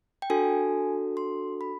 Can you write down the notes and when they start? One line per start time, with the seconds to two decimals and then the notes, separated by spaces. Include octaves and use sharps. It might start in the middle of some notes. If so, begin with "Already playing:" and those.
0.22 G5
0.30 D4 F#4 A4 G#5
1.17 C6
1.61 B5